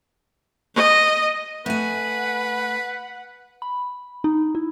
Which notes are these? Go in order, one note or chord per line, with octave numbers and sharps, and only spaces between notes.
D#5
A3 B4 F#5 G#5
B5
D#4
E4